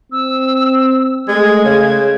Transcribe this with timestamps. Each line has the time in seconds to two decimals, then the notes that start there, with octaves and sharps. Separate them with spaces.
0.12 C4 E6
1.28 G#3 A3 G#6
1.65 C#3